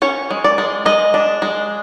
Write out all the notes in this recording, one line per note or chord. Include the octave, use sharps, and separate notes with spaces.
C#4 C#5
G#3
D5
G#3
G#3 D#5
D4
G#3